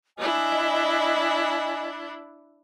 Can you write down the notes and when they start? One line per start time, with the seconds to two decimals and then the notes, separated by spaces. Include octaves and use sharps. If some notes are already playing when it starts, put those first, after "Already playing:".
0.18 D4 E4 D#5 G#5